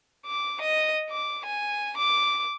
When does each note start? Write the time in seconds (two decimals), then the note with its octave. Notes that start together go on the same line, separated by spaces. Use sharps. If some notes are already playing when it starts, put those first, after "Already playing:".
0.24 D6
0.60 D#5
1.09 D6
1.45 G#5
1.97 D6